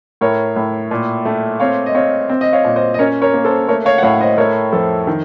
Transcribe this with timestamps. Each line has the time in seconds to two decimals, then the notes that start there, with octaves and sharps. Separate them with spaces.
0.21 A2 A#4 C#5
0.56 A2
0.91 A#2
1.25 A3
1.60 C4 C#5 F5
1.86 D#5
1.95 C4 C#5 F5
2.29 C4
2.41 D#5
2.53 C#5 F5
2.64 A#2
2.76 C5 D#5
2.94 D#5
2.99 C#4 A#4 C#5
3.22 A#4 C#5
3.34 A#3
3.45 A4 C5
3.68 A3 A#4 C#5
3.85 C#5 F5
3.98 F#5
4.03 A2 C#5 F5
4.21 C5 D#5
4.37 A3 A#4 C#5
4.72 F2 A4 C5
5.07 D#3